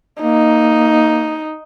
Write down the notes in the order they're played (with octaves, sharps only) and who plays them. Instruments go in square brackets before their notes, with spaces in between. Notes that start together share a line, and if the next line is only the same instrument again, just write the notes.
[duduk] A#3 [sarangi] D#4